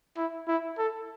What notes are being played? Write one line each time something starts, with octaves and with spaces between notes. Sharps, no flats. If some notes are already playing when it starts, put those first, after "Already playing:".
E4
E4
A4